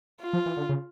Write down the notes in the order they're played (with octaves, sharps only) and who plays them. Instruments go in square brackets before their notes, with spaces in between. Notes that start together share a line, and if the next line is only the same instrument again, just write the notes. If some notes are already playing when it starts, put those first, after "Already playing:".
[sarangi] F4
[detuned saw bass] F3
E3
D3
C#3